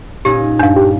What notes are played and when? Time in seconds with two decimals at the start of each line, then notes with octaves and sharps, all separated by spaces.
0.25 A#2 C#4 D#4 G4
0.59 G2 D4 F5
0.76 G4